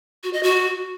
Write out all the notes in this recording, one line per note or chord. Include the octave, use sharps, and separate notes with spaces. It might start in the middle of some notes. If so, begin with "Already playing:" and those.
F#4
D#5
F#4